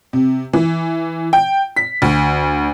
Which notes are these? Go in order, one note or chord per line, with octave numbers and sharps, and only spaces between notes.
C3
E3
G5
B6
D2